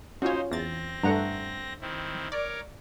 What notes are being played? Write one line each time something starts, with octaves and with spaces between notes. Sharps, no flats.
C#4 D#4 F4 F#4 C5 C#5
E2 C4 A6 A#6
G2 A3 F#5 A#5
D#3 C4 E4
A#4 C#5 D5 D6